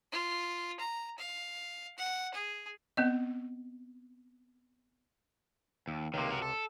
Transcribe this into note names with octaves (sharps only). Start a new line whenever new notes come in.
F4
A#5
F5
F#5
G#4
B3 C4 D#5
D#2
C#2 C3 D#3 A#3
F#4 A#4
A4